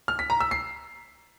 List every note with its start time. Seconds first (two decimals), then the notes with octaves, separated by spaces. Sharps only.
0.08 F6
0.19 B6
0.30 A#5
0.40 E6
0.51 C7